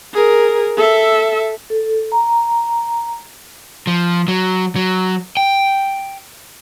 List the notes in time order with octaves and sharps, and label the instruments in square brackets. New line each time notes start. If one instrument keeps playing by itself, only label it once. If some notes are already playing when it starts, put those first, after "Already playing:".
[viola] G#4 A#4
A4 E5
[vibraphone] A4
A#5
[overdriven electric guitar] F3
F#3
F#3
G5